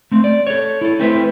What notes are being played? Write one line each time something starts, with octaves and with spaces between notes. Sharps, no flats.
A3 C4
D5
A4 C#5
E4 A4
A3 C4 E4 B4 C5 E5